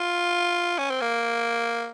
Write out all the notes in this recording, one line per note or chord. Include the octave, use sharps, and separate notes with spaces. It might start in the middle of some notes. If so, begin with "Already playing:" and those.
Already playing: F4
C#4
C4
A#3